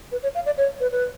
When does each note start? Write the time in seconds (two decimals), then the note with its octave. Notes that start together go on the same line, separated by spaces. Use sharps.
0.12 B4
0.23 C#5
0.35 F5
0.46 D5
0.58 C#5
0.80 B4
0.92 B4